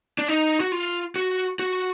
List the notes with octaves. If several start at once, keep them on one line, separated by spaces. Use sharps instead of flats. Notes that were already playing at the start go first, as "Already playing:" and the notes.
D4
D#4
F#4
F4
F#4
F#4